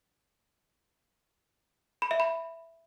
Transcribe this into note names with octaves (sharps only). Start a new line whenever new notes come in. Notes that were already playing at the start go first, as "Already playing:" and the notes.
B5
E5
B5